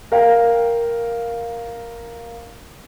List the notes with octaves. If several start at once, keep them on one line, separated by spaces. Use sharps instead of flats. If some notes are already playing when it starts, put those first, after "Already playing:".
A#4 F5 G5